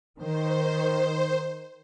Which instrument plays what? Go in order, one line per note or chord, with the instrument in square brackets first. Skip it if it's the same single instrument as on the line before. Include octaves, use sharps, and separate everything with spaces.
[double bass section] D#3 [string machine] C5